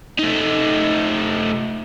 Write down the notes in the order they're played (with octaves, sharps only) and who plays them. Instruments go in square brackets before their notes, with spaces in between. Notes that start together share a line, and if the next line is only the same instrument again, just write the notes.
[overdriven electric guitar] A3 D#4